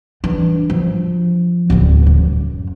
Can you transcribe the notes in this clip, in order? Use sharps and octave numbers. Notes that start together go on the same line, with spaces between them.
E3 D4
F3
D1 D2
F#2